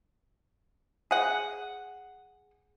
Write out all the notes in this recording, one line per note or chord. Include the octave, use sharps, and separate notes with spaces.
G#4 F#5